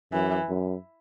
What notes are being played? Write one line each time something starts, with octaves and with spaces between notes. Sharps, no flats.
F#2 E3
F#2